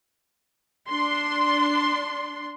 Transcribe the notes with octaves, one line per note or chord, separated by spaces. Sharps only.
D4 C6